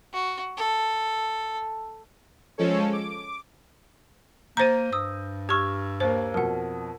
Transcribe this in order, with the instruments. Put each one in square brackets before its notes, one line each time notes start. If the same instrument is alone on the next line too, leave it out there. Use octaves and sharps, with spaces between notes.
[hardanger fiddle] F#4
A4
[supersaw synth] F3 G#3 C#4 A4 C#5
D6
[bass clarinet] A#3 [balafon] C5 A#5 [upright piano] G6 A#6 D#7
[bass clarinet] G2 [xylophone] D#6 E6
[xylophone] G4 C#6 [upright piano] E6 F6 G#6
[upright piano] D#2 A#3 [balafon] C5
[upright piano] F2 B2 [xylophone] A#4 F#5